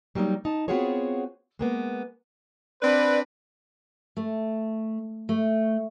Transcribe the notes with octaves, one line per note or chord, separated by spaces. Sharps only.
F#3 G3 A#3 C#4 D#4
D#4 A5
B3 C4 F4 F#4 G#4 C#5
G#3 A#3 B3
C4 D4 B4 D5
A3
A3